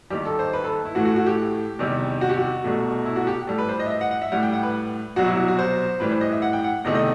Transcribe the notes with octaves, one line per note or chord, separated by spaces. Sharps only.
D#2 D#3 G3 G4
A4
C5
B4
A4
E4
A2 E3 A3 F#4
F#4
F#4
G4
E2 C3 D#3 G3
F#4
G4
F#4
C2 B2 A3
E4
F#4
G4
A2 G3 A4
B4
C5
D#5
E5
D#5
F#5
F#5
E5
A2 G3 F#5
G5
F#5
B4
C2 B2 F#3 F#4
E4
F#4
F#4
C5
A2 E3 G3 B4
C5
D#5
E5
F#5
G5
F#5
E2 C3 D#3 A3 D#5
D#5